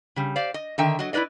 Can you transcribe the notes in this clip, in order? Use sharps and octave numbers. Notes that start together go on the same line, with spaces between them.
C#3 G3
G4 C5 D5 F5
D#5
D3 D#3 E5 G5
F#3 D#5
E4 F4 B4 D5 D#5